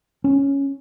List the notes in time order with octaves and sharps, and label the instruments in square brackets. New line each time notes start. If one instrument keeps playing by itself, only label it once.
[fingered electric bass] C#4